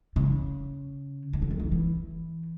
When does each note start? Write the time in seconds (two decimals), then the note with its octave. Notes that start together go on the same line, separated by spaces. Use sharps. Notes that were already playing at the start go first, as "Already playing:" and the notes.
0.16 C#3
1.33 F#3
1.42 E3
1.50 D#3
1.60 E3
1.72 E3